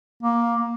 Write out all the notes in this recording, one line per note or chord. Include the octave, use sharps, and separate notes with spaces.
A#3